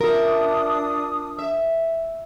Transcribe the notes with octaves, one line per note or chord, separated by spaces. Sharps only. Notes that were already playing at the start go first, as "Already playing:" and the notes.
D4 F4 A#4 E5 D#6
E5